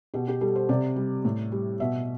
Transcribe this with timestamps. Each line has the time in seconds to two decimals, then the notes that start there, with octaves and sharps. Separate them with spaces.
0.14 B2 G4
0.28 G4
0.41 G3 A4
0.56 C5
0.69 C3 D5
0.96 G3
1.25 A2
1.52 G3
1.80 B2 E5